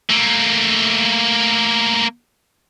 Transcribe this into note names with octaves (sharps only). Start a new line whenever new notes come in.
A3 A#3